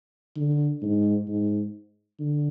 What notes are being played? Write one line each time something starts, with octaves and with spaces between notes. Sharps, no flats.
D3
G#2
G#2
D3